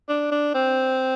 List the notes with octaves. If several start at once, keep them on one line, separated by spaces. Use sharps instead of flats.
D4
D4
C4